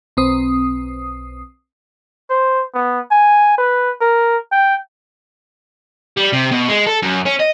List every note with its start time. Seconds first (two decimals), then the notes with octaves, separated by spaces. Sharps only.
0.17 B1 C4 D#6
2.30 C5
2.74 B3
3.11 G#5
3.58 B4
4.01 A#4
4.52 G5
6.17 G3
6.33 C3
6.51 B2
6.69 G#3
6.87 A4
7.03 F#2
7.26 C#4
7.39 D#5